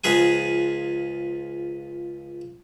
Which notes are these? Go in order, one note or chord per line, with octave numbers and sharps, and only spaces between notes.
C#2 F3 G#4 B4 G#5